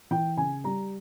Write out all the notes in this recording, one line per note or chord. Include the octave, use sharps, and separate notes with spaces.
E3 G5
C#3 G#5
G3 A#5